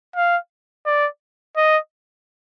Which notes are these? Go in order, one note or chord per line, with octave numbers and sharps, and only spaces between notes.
F5
D5
D#5